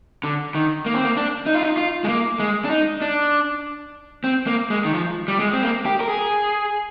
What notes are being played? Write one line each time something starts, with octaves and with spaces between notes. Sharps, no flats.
D3
D#3
A#3
C4
A#3
D4
D#4
F4
D#4
F4
G#3
A#3
G#3
D4
D#4
D4
C4
A#3
G#3
D#3
F3
G3
G#3
C4
A#3
G4
A#4
G#4